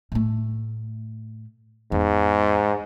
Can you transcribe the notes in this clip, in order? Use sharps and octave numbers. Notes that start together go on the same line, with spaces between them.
A2 A3
E2 G#2